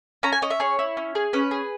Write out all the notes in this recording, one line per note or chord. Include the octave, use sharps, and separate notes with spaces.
C#4 A#5
G#5
C#4 D#5
E5
G#4 C#5
E4
C#4
G#4
C#4 B4
G#4